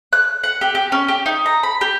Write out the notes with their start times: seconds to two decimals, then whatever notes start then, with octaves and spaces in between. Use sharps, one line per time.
0.13 F#6
0.44 F#5
0.61 G4
0.75 G4
0.92 C#4
1.08 G4
1.26 D#4
1.46 A#5
1.63 B5
1.81 G4